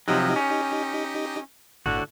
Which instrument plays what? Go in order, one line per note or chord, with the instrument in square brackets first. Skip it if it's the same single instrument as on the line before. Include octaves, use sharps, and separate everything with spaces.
[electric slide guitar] C3 F3 F#3 [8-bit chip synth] D#4 G4 D#5
[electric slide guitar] C#4
[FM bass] G1 [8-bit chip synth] A2 [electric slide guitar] D3 F#4